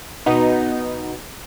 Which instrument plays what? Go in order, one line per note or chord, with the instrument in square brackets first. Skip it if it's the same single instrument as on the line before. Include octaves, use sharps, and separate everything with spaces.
[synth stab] B2 B3 D#4